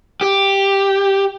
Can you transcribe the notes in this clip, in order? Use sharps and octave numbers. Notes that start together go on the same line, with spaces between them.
G4